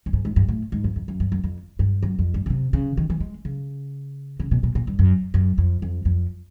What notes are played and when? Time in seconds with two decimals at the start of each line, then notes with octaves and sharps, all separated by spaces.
0.06 G2
0.13 G#2
0.25 G#2
0.36 G2
0.48 A2
0.72 G#2
0.84 F2
0.96 F2
1.08 F#2
1.20 G2
1.32 F#2
1.44 F2
1.79 G2
2.03 F#2
2.19 F2
2.34 G2
2.46 C#3
2.50 C3
2.73 C#3
2.97 D#3
3.10 E3
3.20 G#3
3.45 C#3
4.40 C#3
4.51 B2
4.63 A#2
4.75 A#2
4.87 G2
4.99 F#2
5.34 F#2
5.58 F2
5.82 F2
6.05 F2